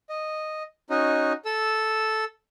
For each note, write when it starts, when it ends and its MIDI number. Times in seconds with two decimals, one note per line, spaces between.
0.09 0.63 75
0.90 1.33 61
0.90 1.33 63
0.90 1.33 66
0.90 1.33 75
1.45 2.25 69
1.45 2.25 88